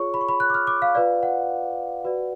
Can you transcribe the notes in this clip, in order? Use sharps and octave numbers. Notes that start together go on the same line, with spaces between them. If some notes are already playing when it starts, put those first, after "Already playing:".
Already playing: F4 G#4 C#5 C#6
B5
C#6
B5
F#6
D6
F6
D6
F5
F4 B4 D5 F5
F#5
F#4 B4 D5